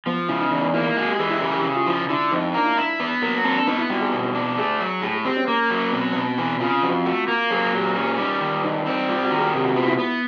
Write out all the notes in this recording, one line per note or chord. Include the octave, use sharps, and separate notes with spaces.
F3 B3
C#3 E4
D#4
E2 D#4
A#3 E4
G#3 F#4
G4
E3 G#4
E4
C#3 G#4
G4
C#3
F4
F3 E4
D3 E4
F2 D#4
D#4
A#3 D4
E4
D4 E4
B3
F#3 A#3
C4 A4
D4
B3 D#4
E4
G3 F#4
G#4
B2
D4
A3 G#4
F#3
A2 G#4
G#4
C4 G4
C#4
A#3
F#3
B2 C4
B2
E3 C4
C#3 F4
F2 F#4
A3 F#4
A#3
F#3 G#4
A#2 G4
C#4 G4
G3 D#4
D#3
G2 D#4
C4
G3 F4
F#4
D#3
G#4
C3 G4
F#4
B3 F4
E4
B3